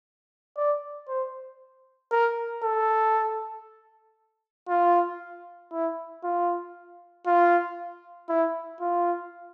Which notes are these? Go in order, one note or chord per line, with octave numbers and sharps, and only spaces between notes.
D5
C5
A#4
A4
F4
E4
F4
F4
E4
F4